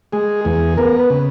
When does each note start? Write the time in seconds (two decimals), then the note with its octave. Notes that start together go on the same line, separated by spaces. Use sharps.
0.13 G#3 G#4
0.45 E2 G#4
0.77 B3 A#4
0.99 B4
1.10 C#3